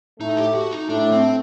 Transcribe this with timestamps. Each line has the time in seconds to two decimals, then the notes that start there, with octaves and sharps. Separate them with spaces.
0.20 A2 A3 D#4
0.37 G4
0.55 F#4
0.71 D#4
0.89 A2 A3 D4
1.12 C4